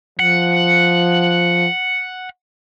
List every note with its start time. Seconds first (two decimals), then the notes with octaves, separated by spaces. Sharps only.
0.19 F3 F#5